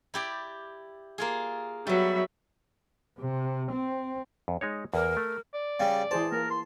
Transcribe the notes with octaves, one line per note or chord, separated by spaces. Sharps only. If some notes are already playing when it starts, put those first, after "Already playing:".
E4 G4 D5
A#3 F4 G#4
F#3 G3 B3 E5
C3
C4
F2
G#3 D#4 C#5
E2 A#4
A3
D5
C#3 G3
E3 G#4 C5 A5
A#3 A#4
C6